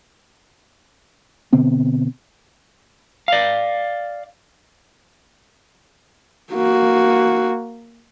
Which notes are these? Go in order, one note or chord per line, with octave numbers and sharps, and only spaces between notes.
B2 D3 B3 C4
D5 F5
A#3 F#4